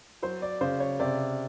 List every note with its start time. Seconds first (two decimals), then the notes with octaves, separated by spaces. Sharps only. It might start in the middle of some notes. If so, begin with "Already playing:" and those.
0.22 F#3 C5
0.42 D5
0.61 C#3 C5
0.80 C#5
0.99 C3 D5